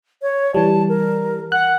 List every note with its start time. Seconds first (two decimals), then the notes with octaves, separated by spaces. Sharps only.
0.22 C#5
0.55 E3 G3 A5
0.89 A#4
1.52 F#5 F#6